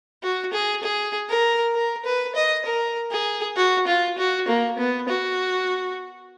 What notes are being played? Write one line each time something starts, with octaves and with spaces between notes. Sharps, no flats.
F#4
G#4
G#4
A#4
A#4
B4
D#5
A#4
G#4
F#4
F4
F#4
A#3
B3
F#4